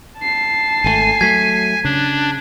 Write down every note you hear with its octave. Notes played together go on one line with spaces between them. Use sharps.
A5 C7
G#1 D3 A3 G#5
F#3 A3 G#6 B6
C#3 D4